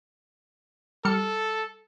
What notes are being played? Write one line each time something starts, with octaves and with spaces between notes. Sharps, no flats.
G3 A4 F6 C#7